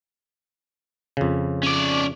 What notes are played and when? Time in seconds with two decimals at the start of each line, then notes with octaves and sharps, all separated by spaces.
1.17 F2 C#3
1.63 C#4 D5